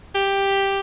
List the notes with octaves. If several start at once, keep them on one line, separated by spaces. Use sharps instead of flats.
G4